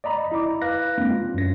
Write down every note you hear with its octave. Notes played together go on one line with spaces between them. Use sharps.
D5 D#5 A#5 B5
E4 D6
B4 F5 F#6 A#6
G#3 A#3 C4 D4
F4
F#2 A#6